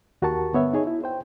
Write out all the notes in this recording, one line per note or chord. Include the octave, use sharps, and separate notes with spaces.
D#2 F#4 G4 A#4 A5 C#6
G2 D3 B3 C#5 E5
D#4 G#4 C#5
E4
C5 G5